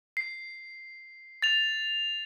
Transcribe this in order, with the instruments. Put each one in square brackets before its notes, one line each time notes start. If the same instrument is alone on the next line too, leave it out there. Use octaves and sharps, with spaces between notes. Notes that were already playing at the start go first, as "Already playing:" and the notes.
[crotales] C7
A6 F7